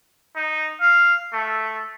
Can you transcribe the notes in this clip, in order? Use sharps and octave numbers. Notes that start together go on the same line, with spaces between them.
D#4
F5
A3